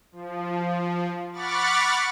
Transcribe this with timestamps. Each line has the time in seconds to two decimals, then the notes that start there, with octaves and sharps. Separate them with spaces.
0.12 F3
1.32 F#5 B5 C#6 D6 F6 A6